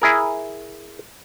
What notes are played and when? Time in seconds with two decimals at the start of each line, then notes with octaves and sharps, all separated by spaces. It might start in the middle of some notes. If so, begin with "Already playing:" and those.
0.02 E4 G#4 A#4